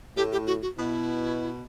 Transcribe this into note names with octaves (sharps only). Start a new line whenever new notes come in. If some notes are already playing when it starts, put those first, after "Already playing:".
A2 G4
G4
F#4
F#4
B2 E4